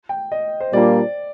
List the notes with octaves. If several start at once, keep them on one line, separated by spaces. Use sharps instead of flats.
G5
D#5
C5
A#2 G3 A#3 D4 F4 D5